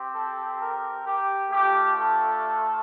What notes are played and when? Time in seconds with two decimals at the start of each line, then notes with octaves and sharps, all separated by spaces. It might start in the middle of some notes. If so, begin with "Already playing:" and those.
Already playing: C4 G4
0.15 A4
0.60 A#4
1.06 G4
1.50 A3 D4 F4 G4
1.95 A4